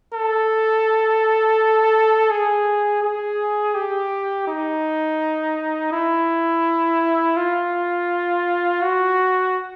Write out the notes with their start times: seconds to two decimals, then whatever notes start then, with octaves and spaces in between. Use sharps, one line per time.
0.14 A4
2.30 G#4
3.03 G#4
3.75 G4
4.48 D#4
5.92 E4
7.37 F4
8.82 F#4